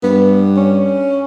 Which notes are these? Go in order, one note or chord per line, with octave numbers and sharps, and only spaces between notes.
G2 B3
C#4